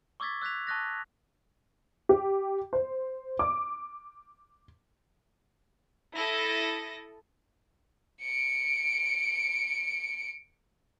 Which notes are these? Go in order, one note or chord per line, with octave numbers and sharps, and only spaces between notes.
C#6 D6 E6 G#6 A6 B6
E6 F#6 G#6 B6 F7
A5 C#6 D#6 F#6 A6 A#6
G4
C5
D6
E4 A4 D#6 A#6
C#7 D7